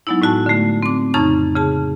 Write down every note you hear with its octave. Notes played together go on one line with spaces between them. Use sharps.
F#3 G#3 B3 D#4 E4
A2 G#3 F#4 A5
D3 A3
C4 D6
F2 C#3 D#4 A#5 C#6 A6
C#3 G#4 A5